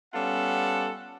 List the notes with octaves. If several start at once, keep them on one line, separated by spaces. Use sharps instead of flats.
G3 B3 C#4 F4 A4 F#5